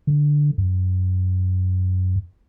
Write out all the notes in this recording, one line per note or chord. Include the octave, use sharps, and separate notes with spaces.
D3
F#2